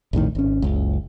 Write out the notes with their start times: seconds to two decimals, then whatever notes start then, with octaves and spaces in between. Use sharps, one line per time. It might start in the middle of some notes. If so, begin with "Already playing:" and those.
0.13 A#1 F2 A2 D#3
0.35 G#1 C#4
0.62 F#1 C#2